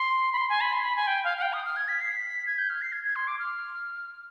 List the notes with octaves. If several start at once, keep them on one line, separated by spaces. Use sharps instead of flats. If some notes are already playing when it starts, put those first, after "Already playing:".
Already playing: C6
B5
C6
G#5
B5
C6
B5
G#5
G5
F5
F5
G5
D#6
F6
G#6
B6
C7
B6
G#6
G6
F6
C7
G#6
G#6
C6
D6
F6